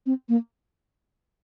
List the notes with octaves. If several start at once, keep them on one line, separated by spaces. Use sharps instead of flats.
C4
A#3